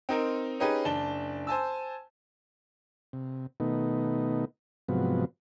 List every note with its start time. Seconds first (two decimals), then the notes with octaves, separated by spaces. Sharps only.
0.09 C4 D#4 A#4
0.60 C#4 D#4 G4 G#4 B4
0.85 F#1 D4 A5 G7
1.47 C5 G#5 A5 E6
3.13 C3
3.60 B2 D#3 A3 B3 D#4
4.89 G#2 C3 F3 F#3 B3